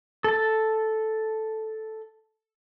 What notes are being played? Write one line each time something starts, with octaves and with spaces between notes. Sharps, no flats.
A4 A5